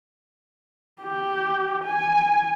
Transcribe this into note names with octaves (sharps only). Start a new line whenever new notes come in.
G4
G#5